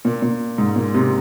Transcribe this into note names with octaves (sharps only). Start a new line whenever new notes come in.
A#2
A#2
G#2
A#2
C3